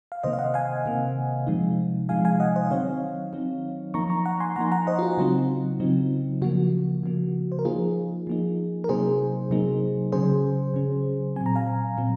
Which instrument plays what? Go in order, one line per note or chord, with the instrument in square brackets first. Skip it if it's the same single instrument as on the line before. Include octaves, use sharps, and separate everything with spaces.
[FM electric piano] F5
C3 D#3 A#3 C5 D#5
F5
D#5 F#5
F5 G#5
C3 D#3 A#3
C3 F3 G#3 D#4
C3 F3 G#3 D#4 F5 G#5
F5 G#5
D#5 F#5
C5 D#5
D#3 F#3 C4 D#4 C#5 F5
D#3 F#3 C4 D#4
F3 A#3 D#4 A#5 C#6
A#5 C#6
F#5 A#5
G#5 C6
F3 A#3 D#4 F#5 A#5
F#5 A#5
C5 D#5
F4
F#4
C#3 F#3 C4 D#4 F4
C#3 F#3 C4 D#4
C#3 F3 A#3 F#4
C#3 F3 A#3
C5
A#4
F3 A#3 D#4 F4 G#4
F3 A#3 D#4
A#4
C3 F#3 A#3 D#4 G#4 C5
C3 F#3 A#3 D#4
C#3 F#3 C#4 G#4 C5
C#3 F#3 C#4
A#2 F#3 C4 G#5
A#5
F5 G#5
A#2 F#3 C4